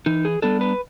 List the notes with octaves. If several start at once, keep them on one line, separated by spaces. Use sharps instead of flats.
E3 D#4
G#4
G3 B3 D4 A4
B4